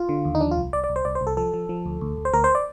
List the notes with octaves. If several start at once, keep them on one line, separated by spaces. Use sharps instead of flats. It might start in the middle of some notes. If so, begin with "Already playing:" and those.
Already playing: F4
D3
D#2
D#4
F3 D4
F4
C2
C2 D5
D5
C2
C5
C2 D5
C5
C2
A4
F3 A4
F3
F3
D2
D2
D2
C5
D2 A#4
C5
D5